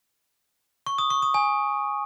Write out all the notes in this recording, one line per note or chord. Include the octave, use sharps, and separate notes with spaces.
C#6
D#6
C#6
D#6
G#5